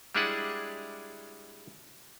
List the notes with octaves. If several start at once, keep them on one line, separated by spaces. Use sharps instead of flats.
G3 G#3 D4 E4 G#4 F#5